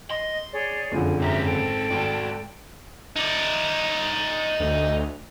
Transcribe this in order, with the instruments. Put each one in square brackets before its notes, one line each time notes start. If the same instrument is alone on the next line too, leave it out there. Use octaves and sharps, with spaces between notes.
[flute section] D#5 [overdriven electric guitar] C6
[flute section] G#4 C#5 D5
[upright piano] F#1 F2 D3 [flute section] G#5
[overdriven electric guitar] G#2 C4 [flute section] G4 A#4 E5
[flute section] A4 G5
[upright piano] G#1 [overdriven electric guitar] F#4 D5
[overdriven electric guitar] D#4 D5
[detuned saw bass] D2